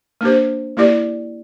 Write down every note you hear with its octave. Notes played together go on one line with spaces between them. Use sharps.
A#3 D4 G4 C5
A#3 E4 G4 D5